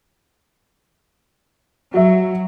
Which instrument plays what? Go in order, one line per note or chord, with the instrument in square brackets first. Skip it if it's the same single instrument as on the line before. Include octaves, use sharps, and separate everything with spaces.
[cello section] F#3 [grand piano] F#4 E5